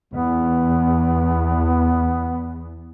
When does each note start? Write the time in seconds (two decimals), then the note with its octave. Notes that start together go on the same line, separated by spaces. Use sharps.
0.13 E2 B3